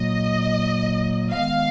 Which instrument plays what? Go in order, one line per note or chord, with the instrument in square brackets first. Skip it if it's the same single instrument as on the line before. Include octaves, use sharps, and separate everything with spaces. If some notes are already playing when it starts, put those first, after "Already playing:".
Already playing: [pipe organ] A#2 F#3 A#3 [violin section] D#5
[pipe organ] D#3 G#3 B3 [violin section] F5